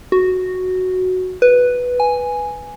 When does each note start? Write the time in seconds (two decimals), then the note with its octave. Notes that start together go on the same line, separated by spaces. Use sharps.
0.12 F#4
1.42 B4
2.00 G#5